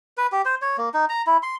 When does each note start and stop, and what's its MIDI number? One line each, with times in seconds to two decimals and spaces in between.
0.18 0.27 71
0.32 0.42 67
0.45 0.55 72
0.62 0.77 73
0.78 0.89 58
0.94 1.05 63
1.09 1.22 82
1.27 1.37 64
1.43 1.56 84